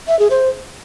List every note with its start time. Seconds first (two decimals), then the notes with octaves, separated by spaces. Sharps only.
0.08 E5
0.19 G#4
0.30 C5